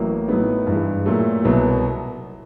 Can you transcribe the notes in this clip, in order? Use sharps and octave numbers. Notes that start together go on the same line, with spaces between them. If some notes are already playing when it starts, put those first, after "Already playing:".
Already playing: A1 A2 F#3 A#3
A2 F#3 B3 D#4
G2 E3 G#3
A#2 F#3 A3
C2 B2 F#3 B3